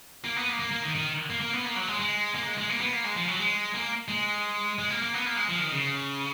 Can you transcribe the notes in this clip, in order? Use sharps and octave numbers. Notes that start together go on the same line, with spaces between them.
A#3
B3
A#3
A#3
A#3
D#3
D#3
A#3
A#3
B3
A#3
F#3
G#3
G#3
A#3
G#3
G#3
A#3
B3
A#3
G#3
F3
F#3
G#3
A#3
G#3
G#3
A#3
A#3
B3
A#3
G#3
F3
D#3
C#3